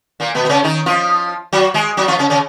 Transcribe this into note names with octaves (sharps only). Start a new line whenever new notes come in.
A#2 A#3
B2 B3
B3
C#3 C#4
D#3 D#4
F3 F4
F#3 F#4
G#3 G#4
F#3 F#4
F3 F4
C#3 C#4
C#3 C#4